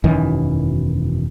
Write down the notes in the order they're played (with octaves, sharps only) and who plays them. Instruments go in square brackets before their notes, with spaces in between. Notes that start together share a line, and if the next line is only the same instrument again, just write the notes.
[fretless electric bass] E1 F#2 D#3 E3